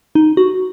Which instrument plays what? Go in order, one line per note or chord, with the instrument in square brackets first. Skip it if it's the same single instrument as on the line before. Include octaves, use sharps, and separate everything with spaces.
[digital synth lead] D#4
F#4